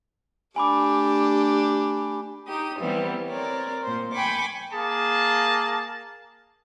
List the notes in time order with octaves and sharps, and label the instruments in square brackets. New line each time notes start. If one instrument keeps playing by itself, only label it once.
[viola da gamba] A3 D4 G4 [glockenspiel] G#5 B5 D6
[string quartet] D#4 G4 D#6
E3 G3 B3 C4
C4 A#4 C#5 D5
A#2 C5
G5 G#5 B5 C#6 D6
[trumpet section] A#3 G#4 A5